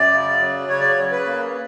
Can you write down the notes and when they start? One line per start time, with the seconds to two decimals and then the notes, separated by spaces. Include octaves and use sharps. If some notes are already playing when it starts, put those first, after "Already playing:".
Already playing: F#2 D5
0.12 C#3
0.40 F#3
0.68 C#3 C#5
0.80 D5
0.90 C#5
0.97 C#3
1.12 B4
1.26 A#3